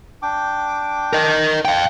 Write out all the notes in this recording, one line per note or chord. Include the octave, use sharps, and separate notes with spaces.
D4 G5 D6
A#4 D#5
F5 G5